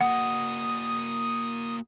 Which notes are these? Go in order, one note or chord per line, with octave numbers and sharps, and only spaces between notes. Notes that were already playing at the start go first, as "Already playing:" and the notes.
A#3 F#4 F#5 D#6